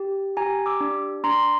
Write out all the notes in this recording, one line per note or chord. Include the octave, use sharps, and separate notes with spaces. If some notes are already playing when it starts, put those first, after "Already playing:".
Already playing: G4
G4 G#5 A#5
D6 E6
D4
D4 A#5 C6